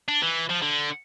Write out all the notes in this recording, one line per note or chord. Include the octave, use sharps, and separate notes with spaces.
D4
E3
F3
D3